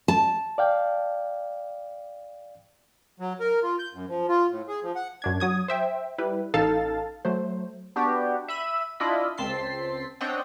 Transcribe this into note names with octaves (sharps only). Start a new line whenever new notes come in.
A5
D5 F5 G5
F#3
A#4
F4
G6
F#2
F3
F4
A2
G#4
F3
F#5
F#2 D4 G#6
F#3 D#6 G#6
C5 E5 G5
G3 E4 B4
A1 D#4 A4 F5 A5 A6
F#3 A3 C5
B3 D4 F#4 G4
E5 B5 D#7
D4 E4 F4 D#5 B5
C#2 C4 A5 C6 B6 C7
C4 D4 C#5 D#5 F#5 G5